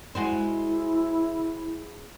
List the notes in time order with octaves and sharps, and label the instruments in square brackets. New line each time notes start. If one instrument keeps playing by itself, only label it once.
[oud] G#3 F#4 C5 [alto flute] E4